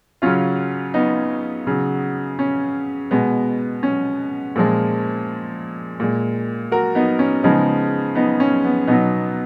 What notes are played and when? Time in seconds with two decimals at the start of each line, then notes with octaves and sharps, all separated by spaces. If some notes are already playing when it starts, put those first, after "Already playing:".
0.22 C#3 F#3 C#4 F4
0.94 B3 D#4
1.67 C#3 F#3
2.39 C#4
3.11 B2 G#3 B3
3.83 C#4
4.56 A#2 F3 G#3
6.00 A#2 G#3
6.71 F#4 A#4
6.95 B3 D#4
7.19 C#4
7.44 C#3 F3 G#3 B3 D#4
8.15 B3 D#4
8.40 C#4
8.64 B3
8.87 B2 F#3 B3 D#4